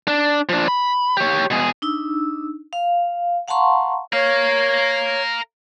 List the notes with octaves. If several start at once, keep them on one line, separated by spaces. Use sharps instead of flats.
D4
F3 D4
B5
G4 C#5
B2 G#4
D4 D#4 E6
F5
F5 F#5 A5 A#5 C6 C#6
A#4 C#5 F5